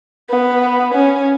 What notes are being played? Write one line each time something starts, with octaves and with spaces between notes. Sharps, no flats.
B3
C#4